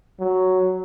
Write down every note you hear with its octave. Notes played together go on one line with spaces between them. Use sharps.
F#3